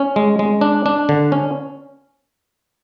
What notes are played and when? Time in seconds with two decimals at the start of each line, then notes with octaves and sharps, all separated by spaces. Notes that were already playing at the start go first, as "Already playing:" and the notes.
Already playing: C#4
0.16 G#3
0.39 G#3
0.61 D4
0.86 D4
1.09 D3
1.32 C#4